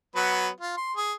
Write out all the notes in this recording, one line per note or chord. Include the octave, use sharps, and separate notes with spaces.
F#3 B3 B4
F4
C6
G#4